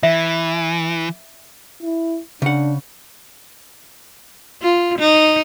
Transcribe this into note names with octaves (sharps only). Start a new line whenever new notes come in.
E3 E5
E4
C#3 D4 F#5
F4
D#4